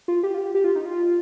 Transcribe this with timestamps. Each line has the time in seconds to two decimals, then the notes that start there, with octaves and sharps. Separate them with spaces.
0.08 F4
0.23 G4
0.34 F4
0.39 G4
0.55 G4
0.64 F4
0.75 D#4
0.86 F4